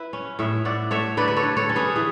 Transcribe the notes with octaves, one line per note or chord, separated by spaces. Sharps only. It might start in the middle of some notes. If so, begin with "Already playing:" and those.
Already playing: E4 B4
C#4
A2 C#5 E5
A2 D5 F#5
A3 C#5 E5
D3 B4 D5
B4
A4 C#5
D3
A4 C#5
C#4
G#4 B4
E3 G#4